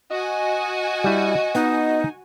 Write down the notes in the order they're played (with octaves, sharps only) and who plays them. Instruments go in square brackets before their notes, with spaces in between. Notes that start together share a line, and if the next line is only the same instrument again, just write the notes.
[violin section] F#4 G#5 [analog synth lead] D#5
[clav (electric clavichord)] G3 E4
[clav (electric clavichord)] B3 F#5 [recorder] D#4